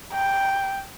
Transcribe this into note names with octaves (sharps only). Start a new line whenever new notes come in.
G5